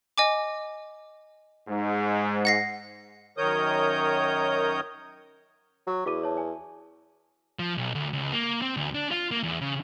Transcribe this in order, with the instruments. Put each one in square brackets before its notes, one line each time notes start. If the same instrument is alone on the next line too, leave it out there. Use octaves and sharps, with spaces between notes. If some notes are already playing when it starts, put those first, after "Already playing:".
[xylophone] D#5 G#5 D6
[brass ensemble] G#2
[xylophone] F#5 A#6 C7
[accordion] F#2 D#3 A#4 C#5 D#6 G6
[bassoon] F#3
[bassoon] E2 [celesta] F#4 D6 D#7
[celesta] C#5 A5
G#5
[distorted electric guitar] F3
B1
D2
C#2
A#3
C4
D2
D4
F4
A#3
E2
C#3